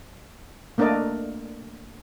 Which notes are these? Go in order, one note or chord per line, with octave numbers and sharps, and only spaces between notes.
A3 A#3 D4 A#4 D5 D#5